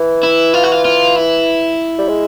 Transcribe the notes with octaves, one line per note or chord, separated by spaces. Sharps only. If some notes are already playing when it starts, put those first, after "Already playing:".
Already playing: E3
E4
F4
F#4
F4
F4
E4
G3
G#3